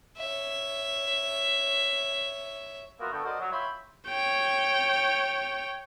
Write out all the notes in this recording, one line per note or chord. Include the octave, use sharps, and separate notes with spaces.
C#5 E5
A#3 B3 F4 F#4 A#4 E5
D3 B3 A4 G5 C#6
F#4 A#4 C5 D5 D#5
F#3
F4 C#5 E5 G5 B5 C6
C#5 G5